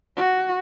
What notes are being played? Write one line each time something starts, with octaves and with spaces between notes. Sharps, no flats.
F#4